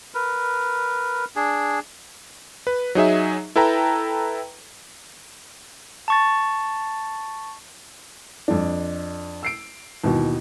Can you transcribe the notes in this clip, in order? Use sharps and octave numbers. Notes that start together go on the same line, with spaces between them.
A#4 B4
D4 G#4
B4
F#3 D#4 G#4 E5
E4 A4 B4 G5 A#5
A5 C#6 A6
F2 D4
E6 C7 D7
D#2 B2 E3